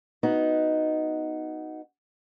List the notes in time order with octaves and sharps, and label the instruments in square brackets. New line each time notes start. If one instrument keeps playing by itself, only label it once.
[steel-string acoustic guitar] B3 D#4 F#4